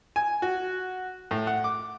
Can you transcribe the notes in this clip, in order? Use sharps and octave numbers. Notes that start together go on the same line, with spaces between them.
G#5
F#4
A2
F#5
D6